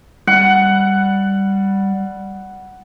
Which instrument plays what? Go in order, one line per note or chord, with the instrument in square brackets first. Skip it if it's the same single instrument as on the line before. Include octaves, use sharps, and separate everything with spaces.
[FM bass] G3 [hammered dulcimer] F#5